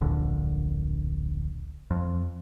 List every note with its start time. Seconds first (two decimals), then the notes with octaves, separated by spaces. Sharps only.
0.01 D1 A#1 D3
1.91 F2